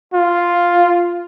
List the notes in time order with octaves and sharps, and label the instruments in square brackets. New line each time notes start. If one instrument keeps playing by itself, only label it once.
[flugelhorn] F4